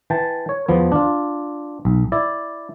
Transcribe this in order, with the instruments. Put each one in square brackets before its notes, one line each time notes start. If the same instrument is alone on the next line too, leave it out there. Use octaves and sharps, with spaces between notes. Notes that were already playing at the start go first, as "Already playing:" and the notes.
[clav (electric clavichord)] E3 G5 A5
C#5
E2 F3 B3
D4 F4
B1
E4 D5